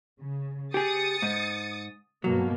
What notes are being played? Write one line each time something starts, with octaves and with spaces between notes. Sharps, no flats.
C#3
G4 G#4 D#6 A6 C#7
G#2
G2 B2 F#3 A#3